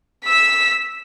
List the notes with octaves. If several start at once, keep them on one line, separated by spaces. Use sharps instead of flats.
E6 B6